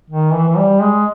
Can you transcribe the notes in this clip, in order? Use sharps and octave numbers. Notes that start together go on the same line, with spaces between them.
D#3
E3
E3
G3
G#3